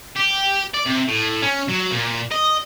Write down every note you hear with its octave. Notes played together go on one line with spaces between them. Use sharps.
G4
D5
C3
A2
C#4
F#3
A#2
D#5